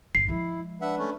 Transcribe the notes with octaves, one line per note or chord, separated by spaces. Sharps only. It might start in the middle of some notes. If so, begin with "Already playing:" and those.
G1 A2 C7
F3 G#3 E4
D4 B4 E5 F#5
A3 C#4